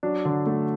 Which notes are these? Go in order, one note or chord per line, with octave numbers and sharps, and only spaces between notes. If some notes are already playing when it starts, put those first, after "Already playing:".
F#3 D4
D3
A3